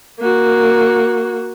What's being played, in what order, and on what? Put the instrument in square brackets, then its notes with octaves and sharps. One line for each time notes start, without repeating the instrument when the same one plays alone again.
[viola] A#3 F#4